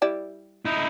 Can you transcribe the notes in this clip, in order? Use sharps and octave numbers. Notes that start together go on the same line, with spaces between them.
G3 E4 D5
D#4 E4